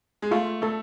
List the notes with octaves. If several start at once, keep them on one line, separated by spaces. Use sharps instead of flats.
G#3
A3 F4
A3 A4